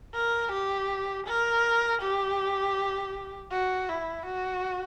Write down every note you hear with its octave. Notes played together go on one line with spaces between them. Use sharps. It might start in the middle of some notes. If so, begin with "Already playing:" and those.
A#4
G4
A#4
G4
F#4
E4
F#4